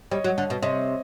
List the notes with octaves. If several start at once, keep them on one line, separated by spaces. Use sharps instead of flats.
G3 C#5 D#5
F#3
D3
B2
C3 C#5 D#5